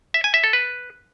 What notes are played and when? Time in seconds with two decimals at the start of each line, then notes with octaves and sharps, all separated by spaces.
0.14 E5
0.24 G#5
0.34 E5
0.44 A4
0.53 B4